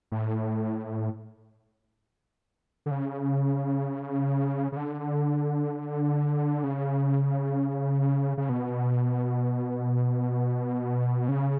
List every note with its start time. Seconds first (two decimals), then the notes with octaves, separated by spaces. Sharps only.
0.12 A2
2.86 D3
2.91 C#3
4.72 C#3
4.77 D3
6.64 C#3
8.38 C#3
8.49 B2
11.29 C#3